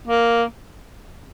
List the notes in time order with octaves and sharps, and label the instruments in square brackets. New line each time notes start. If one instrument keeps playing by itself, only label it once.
[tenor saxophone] A#3